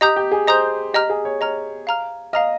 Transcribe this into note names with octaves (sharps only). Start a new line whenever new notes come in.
G4 D#5 A#5 D#6 G6
G4
G#4
C5 D#5 A#5 D#6 G6
G4 D#5 A#5 F6
G#4
C#5
C#5 D#5 A#5 F6
F5 A#5 F6
D#5 F5 A#5 F6